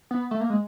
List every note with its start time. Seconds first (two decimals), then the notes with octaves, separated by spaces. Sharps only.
0.11 B3
0.31 A3
0.41 A#3
0.50 G#3